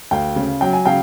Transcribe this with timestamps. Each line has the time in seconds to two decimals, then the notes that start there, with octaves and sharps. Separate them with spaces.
0.11 D2 F5 G5
0.36 C#3
0.61 F#3 G5
0.73 G#5
0.86 C#3 F5 G5